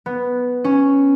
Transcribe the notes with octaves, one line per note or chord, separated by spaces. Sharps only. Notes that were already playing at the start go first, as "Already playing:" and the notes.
B3
C#4